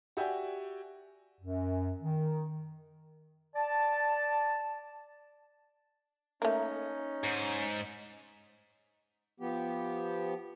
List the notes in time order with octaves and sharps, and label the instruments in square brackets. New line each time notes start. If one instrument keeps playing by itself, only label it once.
[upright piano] F#4 G4 D5 E5 G5 G#5
[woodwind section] F#2
D#3
D5 A5
[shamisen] A3 A#3 [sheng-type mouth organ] C#4 D#4
[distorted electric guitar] G#2
[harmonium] F3 B3 G4